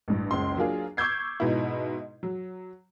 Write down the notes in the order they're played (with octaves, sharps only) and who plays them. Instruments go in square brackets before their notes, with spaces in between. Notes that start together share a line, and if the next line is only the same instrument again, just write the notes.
[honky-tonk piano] A1 G2
F#1 C#2 C#3 C6
F#3 A#3 D4 F4 G#4
C#6 D6 E6 G6 G#6 C7
G#2 B2 D#4 E4
F#3